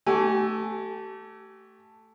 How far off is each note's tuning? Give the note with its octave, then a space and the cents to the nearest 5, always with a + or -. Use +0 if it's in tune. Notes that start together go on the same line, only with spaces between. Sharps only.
A3 +0 G4 -35 G#5 +0